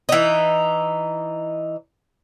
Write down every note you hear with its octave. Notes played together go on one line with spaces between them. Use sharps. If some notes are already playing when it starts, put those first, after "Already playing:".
E3 D#4